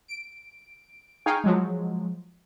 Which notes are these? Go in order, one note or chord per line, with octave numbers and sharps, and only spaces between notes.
D7
D#4 G#4 F5 G5 G#5 C#6
F3 F#3 G#3